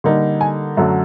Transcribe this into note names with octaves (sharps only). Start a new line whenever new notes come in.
D3 G3 A#3 D#4
G#5
F#2 D3 F#3 A3